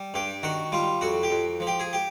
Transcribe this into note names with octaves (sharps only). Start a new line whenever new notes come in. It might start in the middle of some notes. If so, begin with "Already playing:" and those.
Already playing: G3
G2 G4
D#3 F#4
G3 F4
F2 F#4
G4
F2
F3
G4
G#4
G4